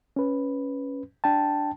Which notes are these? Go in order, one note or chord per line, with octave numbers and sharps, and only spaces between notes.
C#4 B4
D4 G5 A5